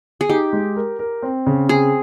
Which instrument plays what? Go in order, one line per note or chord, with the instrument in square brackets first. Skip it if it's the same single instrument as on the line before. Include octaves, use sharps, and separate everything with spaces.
[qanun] G#4
[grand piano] D#4 [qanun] G4
[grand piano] G#3
A#4
A#4
C4
C#3
[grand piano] C4 [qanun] G#4